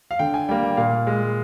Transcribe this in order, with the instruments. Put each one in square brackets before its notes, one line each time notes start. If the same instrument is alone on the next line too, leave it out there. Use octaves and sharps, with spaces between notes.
[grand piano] F5
D3 G5
G#5
G3 A#3 G5
G5
A#2 F5
G#3